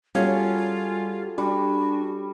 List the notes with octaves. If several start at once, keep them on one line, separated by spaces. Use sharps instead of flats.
G3 C#4 F4 F#4 G#4 A4 F5
G3 D4 F#4